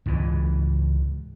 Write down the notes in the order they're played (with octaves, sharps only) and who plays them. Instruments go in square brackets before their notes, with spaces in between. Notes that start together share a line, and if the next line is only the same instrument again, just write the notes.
[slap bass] C#2 G#2 E3